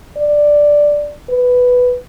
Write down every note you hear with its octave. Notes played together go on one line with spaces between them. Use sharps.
D5
B4